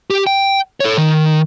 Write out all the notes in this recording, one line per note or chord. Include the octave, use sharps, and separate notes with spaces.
G4
G5
A4 C#5
D#3